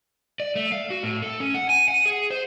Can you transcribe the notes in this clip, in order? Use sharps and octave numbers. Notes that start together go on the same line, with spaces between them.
D5
A3
F5
F#4
A2
A4
C#4
F#5
G#5
F#5
G#4
C5